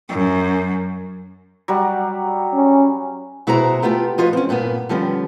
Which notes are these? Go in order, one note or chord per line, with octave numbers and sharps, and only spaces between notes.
F#2
F#3 G3 F#5
C#4
B2 E4 F#4 G#4 C5 A#5
A3 B3 F4 G4
F3 F4 F#4 B4 D#5
C4 C#4
G2 A#2 A#3 B3
D3 F3 G3 B3 C#4